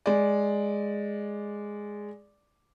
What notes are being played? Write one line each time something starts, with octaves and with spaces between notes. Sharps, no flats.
G#3 D5